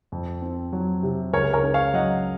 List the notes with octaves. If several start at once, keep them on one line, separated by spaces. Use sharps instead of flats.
F2
C4
F#3
C3
C#2 A#4 C#5
A#4 C#5
C#4
C#5 F5
F#3 D#5 F#5